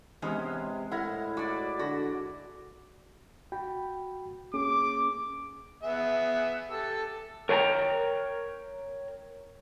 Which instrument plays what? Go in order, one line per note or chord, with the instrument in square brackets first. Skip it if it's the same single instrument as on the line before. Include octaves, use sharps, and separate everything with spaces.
[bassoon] C3 [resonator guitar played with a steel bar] E3 B3 C#4 [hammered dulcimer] G#3
[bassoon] A2 [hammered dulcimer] E4 [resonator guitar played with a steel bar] A#4 F#5
[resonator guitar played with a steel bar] F#4 [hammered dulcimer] D5 D6
[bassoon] D3 [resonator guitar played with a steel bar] F#4
[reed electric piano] F#4 G5 B5
[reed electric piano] A#3 C#4 G#4 [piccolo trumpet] D6
[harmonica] B3 G#4 E5
G4 A4 E6
[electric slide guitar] A#4 C#5 G5 G#5 A#5